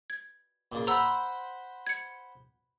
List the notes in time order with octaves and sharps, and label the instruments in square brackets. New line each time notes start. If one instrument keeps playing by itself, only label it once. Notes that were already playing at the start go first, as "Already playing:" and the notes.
[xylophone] G#6
[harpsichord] A#2 C#3
[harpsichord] C5 F#5 B5 [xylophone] A#5 E6
[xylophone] G#6 C#7